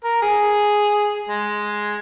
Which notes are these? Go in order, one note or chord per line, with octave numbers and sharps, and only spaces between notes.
A#4
G#4
G#3